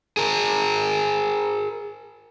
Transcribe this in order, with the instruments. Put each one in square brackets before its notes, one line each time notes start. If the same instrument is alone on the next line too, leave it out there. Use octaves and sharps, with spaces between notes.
[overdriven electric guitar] G#4 A#4